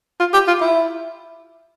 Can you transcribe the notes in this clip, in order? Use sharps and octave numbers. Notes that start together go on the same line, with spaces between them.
F4
G4
F4
E4